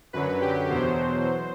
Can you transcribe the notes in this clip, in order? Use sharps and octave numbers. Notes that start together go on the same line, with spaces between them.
F#2 D3 F#3 B4
G4
E2 B2 F#3 C5